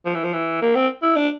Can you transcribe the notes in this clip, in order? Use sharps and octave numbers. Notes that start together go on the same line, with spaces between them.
F3
E3
F3
E3
A#3
C4
E4
D4